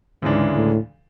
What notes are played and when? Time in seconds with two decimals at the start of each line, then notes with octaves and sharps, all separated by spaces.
0.22 D2 G#2 C#3 E3 G#3 D4
0.56 A2